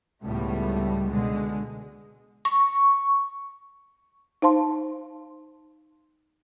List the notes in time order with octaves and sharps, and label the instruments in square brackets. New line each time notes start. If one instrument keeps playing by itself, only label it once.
[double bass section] C#2 A2 G3 A3 B3
B2 D3 G#3
[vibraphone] C#6
[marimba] D#4 C5 F5 A5 C6